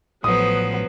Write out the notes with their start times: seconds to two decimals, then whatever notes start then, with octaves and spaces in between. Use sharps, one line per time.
0.24 A1 F3 F#3 B3 D#6